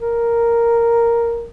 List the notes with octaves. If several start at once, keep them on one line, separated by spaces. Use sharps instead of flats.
A#4